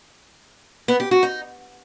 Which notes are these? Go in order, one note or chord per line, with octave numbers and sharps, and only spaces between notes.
B3
G4
F#4
D#4